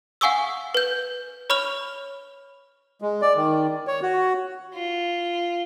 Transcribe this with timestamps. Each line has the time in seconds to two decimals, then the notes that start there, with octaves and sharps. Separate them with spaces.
0.21 F5 F#5 G#5 C#6 D#6 E6
0.75 B4 G6
1.50 C#5 B5 C#6 F6 F7
3.02 G#3
3.21 D5
3.36 D#3
3.87 C#5
4.02 F#4
4.74 F4